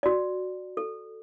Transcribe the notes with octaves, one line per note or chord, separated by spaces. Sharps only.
F#4 D5
A4